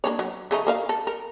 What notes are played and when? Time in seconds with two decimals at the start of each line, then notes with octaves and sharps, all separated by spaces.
0.04 A#3 D4 C#5
0.19 F#3
0.51 C#3 A3 D#4
0.67 A#3 A#4 F5
0.89 A4
1.07 A#4